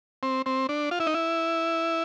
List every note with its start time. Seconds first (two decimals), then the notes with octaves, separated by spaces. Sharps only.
0.23 C4
0.46 C4
0.69 D4
0.91 F4
1.00 E4
1.07 D#4
1.14 E4